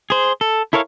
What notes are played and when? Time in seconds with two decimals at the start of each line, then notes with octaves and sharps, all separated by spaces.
0.10 G#4 C5
0.41 A4
0.73 E4 A4 A#4 C#5 F5